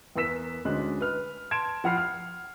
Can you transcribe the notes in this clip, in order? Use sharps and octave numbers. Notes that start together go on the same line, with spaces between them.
E2 B3 A#4 E6 B6 E7
D2 G#3 C#4 D4 F#6
B4 F6
A5 C6 G#6 D7 E7
F3 F#5 B5 F6 C7
F6